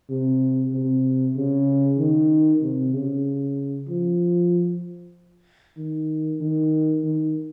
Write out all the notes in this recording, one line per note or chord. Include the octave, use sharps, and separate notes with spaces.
C3
C3
C#3
D#3
C3
C#3
F3
D#3
D#3
D#3